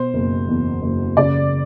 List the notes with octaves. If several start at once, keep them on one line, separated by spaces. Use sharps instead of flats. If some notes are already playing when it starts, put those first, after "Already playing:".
Already playing: B2 C5
F#1
E2
F#1
C#3 D5